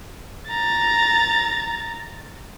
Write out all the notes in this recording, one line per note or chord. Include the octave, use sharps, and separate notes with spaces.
A#5 A6